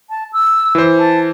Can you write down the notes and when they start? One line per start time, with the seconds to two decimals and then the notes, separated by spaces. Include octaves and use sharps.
0.10 A5
0.33 E6
0.75 E3 C5
0.99 A5